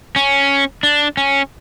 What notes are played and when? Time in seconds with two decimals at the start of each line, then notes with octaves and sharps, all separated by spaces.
0.16 C#4
0.83 D4
1.17 C#4